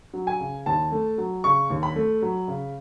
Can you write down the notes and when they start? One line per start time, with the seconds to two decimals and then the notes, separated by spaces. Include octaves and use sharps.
0.13 F#3
0.27 G#5
0.40 C#3
0.66 D#2 A5
0.92 A3
1.18 F#3
1.44 C#3 C#6
1.70 D#2
1.83 B5
1.96 A3
2.22 F#3
2.48 C#3